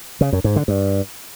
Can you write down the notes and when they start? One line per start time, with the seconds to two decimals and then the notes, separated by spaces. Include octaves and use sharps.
0.21 C#3
0.33 F#2
0.44 G#2
0.56 D3
0.68 G2